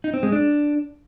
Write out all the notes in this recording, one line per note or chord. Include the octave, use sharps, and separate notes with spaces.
D#4
C4
G#3
D4